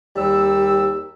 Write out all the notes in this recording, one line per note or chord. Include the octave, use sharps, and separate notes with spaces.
D#2 G3 E6